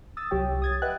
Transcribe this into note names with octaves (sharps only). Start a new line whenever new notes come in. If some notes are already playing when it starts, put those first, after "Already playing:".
D#6 E6 A6
C2 F#3 G4 C#5 G5
D#6 G#6 A6
B4 D#5 E5 F#5 G5 F#6